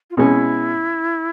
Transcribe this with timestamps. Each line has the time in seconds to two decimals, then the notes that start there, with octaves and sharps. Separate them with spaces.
0.10 F4
0.17 B2 G#3 C#4 E4